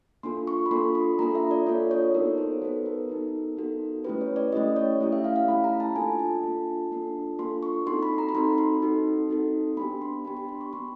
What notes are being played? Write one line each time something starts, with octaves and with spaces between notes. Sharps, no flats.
A#3 D4 F4 A4 C6
C#6
B5
A#3 D4 F4 A4 C6
B5
A#3 D4 F4 A4 A#5
E5
D5
A#3 D4 F4 A4 C#5
C#5
B3 D#4 F#4 A4 A#4
C5
B3 D#4 F#4 A4 B4
A#4
B3 D#4 F#4 A4
B3 D#4 F#4 A4
A3 C#4 E4 G4 B4
C#5
D5
A3 C#4 E4 G4 D#5
C#5
A3 C#4 E4 G4
E5
F5
F5
A3 C#4 E4 G4 B5
A#5
A5
A#3 D4 F4 A4 G#5
A5
A#3 D4 F4 A4
A#3 D4 F4 A4
A#3 D4 F4 A4 C6
C#6
C4 D#4 F#4 A4 C6
B5
A#5
B5
C4 D#4 F#4 A4 C6
C6
C4 D#4 F#4 A4
C4 D#4 F#4 A4
B3 D4 G4 B5
C6
B3 D4 G4 B5
B5
C6
C#6
B3 D4 G4 C6